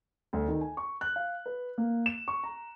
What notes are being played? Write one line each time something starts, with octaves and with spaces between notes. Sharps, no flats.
D2
D#3
G#5
C#6
F#6
F5
B4
A#3
E7
C#6
A#5